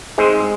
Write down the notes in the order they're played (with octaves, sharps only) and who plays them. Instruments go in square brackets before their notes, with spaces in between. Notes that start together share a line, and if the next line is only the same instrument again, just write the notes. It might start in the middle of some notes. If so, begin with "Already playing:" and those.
[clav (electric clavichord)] G#2 G#3 C4